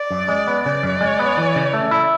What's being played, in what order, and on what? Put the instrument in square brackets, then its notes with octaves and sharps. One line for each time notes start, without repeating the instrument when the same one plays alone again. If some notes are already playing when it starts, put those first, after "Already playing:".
Already playing: [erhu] D5
[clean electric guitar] F#2
G#3
B3
[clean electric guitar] C#3 [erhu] D5
[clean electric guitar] F#2
G#3
B3
E3
C#3
A3
E4